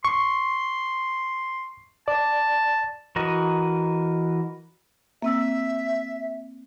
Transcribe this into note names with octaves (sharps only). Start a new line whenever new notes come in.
C6 C#6
D5 A5
E3 F#4 A#4 D#5
A#3 C4 E5 E6